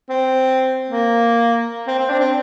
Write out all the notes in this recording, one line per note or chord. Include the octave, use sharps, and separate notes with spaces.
C4
A#3
C4
C4
D4
C4